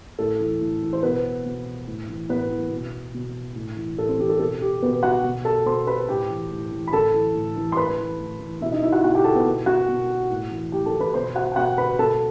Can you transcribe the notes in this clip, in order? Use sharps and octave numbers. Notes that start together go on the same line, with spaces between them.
A2 A4
E3
A2
E3
C5
B2 B3 B4
B2
A2
E3
A2 B3 B4
E3
B2
B2
A2
E3
A2 A4
C4 C5
E3 G4
A4
B2 A4
G4
B2 B3 B4
F#4 F#5
B2
A4 A5
B2 C5 C6
B4 B5
A2 G4 G5
E3
A2
E3
B5
A2 A4 A5
E3
A2
E3
C6
A2 B4 B5
E3
A2
E3
B2 E4 E5
D#4 D#5
E4 E5
F#4 F#5
B2 F#4 F#5
G4 G5
A4 A5
B3 B4
B2
F#4 F#5
B2
A2
E3
A2 G4 G5
A4 A5
E3
B4 B5
B2 C5 C6
F#4 F#5
G5
B2 F#4 F#5
B4 B5
B2 A4 A5